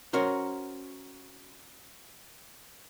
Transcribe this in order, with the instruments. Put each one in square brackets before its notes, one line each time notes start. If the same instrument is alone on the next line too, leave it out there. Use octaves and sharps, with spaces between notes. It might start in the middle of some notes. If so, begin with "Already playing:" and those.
[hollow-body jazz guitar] C#4 F#4 A#4 C5